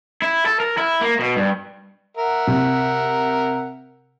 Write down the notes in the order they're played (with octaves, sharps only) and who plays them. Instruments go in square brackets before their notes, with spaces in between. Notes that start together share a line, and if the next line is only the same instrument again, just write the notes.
[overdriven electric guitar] E4
A4
A#4
E4
A#3
B2
G2
[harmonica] A#4 E5 F#5
[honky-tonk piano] C3